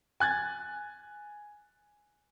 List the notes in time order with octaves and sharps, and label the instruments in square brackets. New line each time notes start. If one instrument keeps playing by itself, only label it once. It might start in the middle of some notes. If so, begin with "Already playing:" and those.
[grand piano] G#5 F#6 G#6 A6